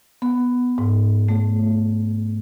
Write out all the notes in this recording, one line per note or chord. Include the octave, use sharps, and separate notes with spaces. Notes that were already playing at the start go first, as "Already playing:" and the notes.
B3
G#2
A3